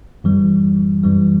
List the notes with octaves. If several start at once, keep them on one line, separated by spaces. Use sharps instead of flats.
F#2 E3 G3
F#2 E3 G3